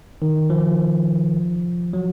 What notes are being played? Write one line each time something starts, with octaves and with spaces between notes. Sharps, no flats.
D#3
F3
F#3